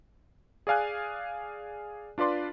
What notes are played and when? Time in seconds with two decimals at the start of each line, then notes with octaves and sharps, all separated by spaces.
0.67 G#4 D5 F5 G#5 F#6
2.18 D4 F4 B4 D5 C6